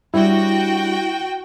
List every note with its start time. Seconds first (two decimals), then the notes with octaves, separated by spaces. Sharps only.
0.14 G3 D4 E4 F#4 C#5 G5